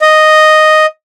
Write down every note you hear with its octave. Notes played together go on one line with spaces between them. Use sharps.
D#5